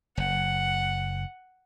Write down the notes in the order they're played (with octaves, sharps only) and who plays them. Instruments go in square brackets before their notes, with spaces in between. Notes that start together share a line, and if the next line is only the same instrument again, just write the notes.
[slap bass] F#1 [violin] F#5